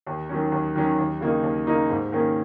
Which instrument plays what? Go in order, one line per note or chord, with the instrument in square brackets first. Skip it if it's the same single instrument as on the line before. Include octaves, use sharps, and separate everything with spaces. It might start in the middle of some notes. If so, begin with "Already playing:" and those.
[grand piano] D#2
D#3 F#3 C#4
D#2
D#3 F#3 C#4
D#2
C#3 A#3 D#4
D#2
C#3 A#3 D#4
G#2
D#3 A#3 C#4